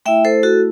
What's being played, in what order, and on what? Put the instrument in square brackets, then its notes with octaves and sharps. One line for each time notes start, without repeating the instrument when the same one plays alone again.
[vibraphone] A3 E4 E5 G5
A4 C5
F#4 A4